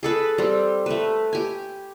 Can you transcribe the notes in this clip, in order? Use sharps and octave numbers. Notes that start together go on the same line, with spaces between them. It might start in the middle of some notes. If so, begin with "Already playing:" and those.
G#4 A4 B4
G3 C4
A3 B4
G4 G#5